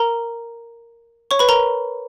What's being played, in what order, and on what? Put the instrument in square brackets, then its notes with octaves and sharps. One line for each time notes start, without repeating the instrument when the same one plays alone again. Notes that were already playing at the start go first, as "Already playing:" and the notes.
Already playing: [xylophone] A#4 A#5
C#5 C#6
B4 B5
A#4 A#5